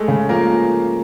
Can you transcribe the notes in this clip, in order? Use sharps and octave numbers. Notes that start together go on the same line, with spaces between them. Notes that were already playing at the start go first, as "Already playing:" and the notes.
Already playing: G#3 A3 A4
C#3
F3 A#3 A#4